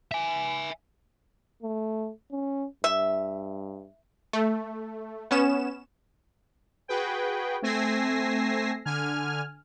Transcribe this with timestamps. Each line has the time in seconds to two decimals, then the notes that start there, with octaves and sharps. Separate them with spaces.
0.12 E5 G#5
1.62 A3
2.31 C#4
2.84 G2 E5
4.33 A3
5.31 B3 C#4 E7
6.88 F#4 G#4 B4 G5
7.62 A3 C4 G#5 E6 A#6 C7
8.85 D3 G#5 F6